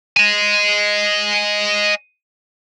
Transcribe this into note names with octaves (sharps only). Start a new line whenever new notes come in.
D#5 G#5